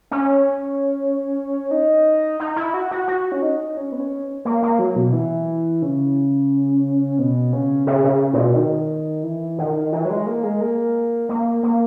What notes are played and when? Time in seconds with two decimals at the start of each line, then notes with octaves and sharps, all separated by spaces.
0.11 C#4
1.71 D#4
2.40 D#4
2.56 E4
2.74 F#4
2.91 F#4
3.08 F#4
3.32 C#4
3.42 D#4
3.77 C#4
3.92 B3
4.00 C#4
4.45 A#3
4.63 A#3
4.79 F#3
4.96 B2
5.13 E3
5.82 C#3
7.19 B2
7.53 C#3
7.87 C#3
8.04 C#3
8.33 A#2
8.38 B2
8.55 D#3
9.23 E3
9.58 D#3
9.93 E3
10.05 F#3
10.10 G#3
10.26 A#3
10.44 G#3
10.61 A#3
11.29 A#3
11.63 A#3